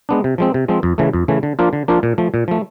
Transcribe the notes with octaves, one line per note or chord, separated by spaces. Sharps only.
G#3 B3 D4
C3
F3 G#3 C4
C3
F3 G#3 C4
F2
C#3 E3 A3
F2
C#3 E3 A3
D3
F3 A#3 D4 F4
D3
F3 A#3 D4 F4
A#2
F3 A3
A#2
F3 A3